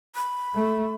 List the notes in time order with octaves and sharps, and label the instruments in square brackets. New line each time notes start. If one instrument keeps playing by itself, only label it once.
[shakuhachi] B5
[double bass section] A3